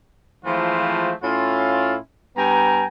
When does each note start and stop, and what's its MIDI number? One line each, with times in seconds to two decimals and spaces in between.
0.45 1.12 52
0.45 1.12 53
0.45 1.12 56
0.45 1.12 57
0.45 1.12 60
0.45 1.12 65
1.22 1.96 45
1.22 1.96 61
1.22 1.96 64
1.22 1.96 65
2.37 2.85 43
2.37 2.85 59
2.37 2.85 79
2.37 2.85 80
2.37 2.85 82